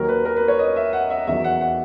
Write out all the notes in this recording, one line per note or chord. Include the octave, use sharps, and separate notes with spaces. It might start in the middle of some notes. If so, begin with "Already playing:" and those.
Already playing: D#2 D#3 F#3 A#4
B4
A#4
B4
C#5
D#5
E5
F#5
E5
E2 D#3 F#3 E5
F#5
F#5